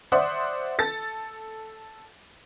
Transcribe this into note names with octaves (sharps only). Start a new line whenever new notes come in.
C5 D5 E5 F#5 C6 D#6
A4 A6